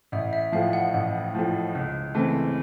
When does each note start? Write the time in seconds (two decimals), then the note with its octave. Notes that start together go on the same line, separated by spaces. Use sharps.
0.12 A1 E5
0.33 E5
0.52 A2 F3 F5
0.73 F#5
0.94 A1
1.35 A2 F3
1.75 C#2
2.15 C#3 E3 A3 C4